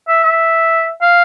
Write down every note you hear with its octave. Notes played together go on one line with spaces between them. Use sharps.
E5
E5
F5